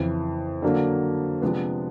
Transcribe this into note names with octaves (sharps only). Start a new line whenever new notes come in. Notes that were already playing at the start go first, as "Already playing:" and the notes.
Already playing: F2 C#3 E3
D3 F#3 A#3 D4
C3 F3 G#3 B3 D4